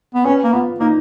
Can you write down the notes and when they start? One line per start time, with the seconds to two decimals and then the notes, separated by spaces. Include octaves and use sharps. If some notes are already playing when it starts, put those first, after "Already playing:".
0.15 B3
0.25 C#4 B4
0.44 A#3
0.53 B3 F4
0.80 A#3 D#4